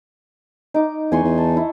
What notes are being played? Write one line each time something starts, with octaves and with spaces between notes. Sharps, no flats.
D#4 D6
E2 G#5 C6 C#6
E2
A5
E4